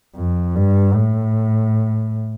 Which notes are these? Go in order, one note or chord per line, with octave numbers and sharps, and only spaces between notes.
F2
G2
A2